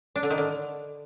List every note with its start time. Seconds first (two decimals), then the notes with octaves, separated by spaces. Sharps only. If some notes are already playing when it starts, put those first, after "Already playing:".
0.16 D4
0.23 D3
0.30 D#3
0.38 D3